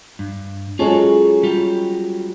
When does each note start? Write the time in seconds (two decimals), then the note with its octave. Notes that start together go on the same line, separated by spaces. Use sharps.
0.19 G2
0.79 F#3 G#3 C#4 F4 G#4 A4
1.43 G3 F4 G4